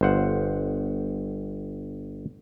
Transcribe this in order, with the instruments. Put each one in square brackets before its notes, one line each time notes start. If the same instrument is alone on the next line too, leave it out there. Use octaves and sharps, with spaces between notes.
[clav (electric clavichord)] G1 C5 F#5